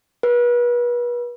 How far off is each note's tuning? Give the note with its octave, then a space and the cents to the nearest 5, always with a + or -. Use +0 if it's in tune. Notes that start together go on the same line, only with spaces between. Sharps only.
B4 -35